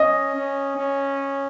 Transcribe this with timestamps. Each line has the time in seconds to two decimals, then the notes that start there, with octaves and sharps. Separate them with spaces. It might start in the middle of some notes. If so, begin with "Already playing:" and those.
Already playing: C#4 D#5
0.35 C#4
0.77 C#4